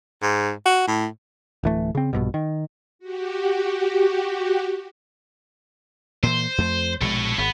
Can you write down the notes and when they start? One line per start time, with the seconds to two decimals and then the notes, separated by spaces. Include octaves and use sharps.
0.22 G#2
0.66 F#4
0.87 A2
1.63 D1 E3 A3
1.95 C#3 C4
2.13 A#1 G2 B2
2.34 D#3
2.99 F#4 G4
6.23 A#2 E3 C5
6.58 F2 A3
7.01 A#1 B2 G#3 A4 C#5
7.38 G#1 B3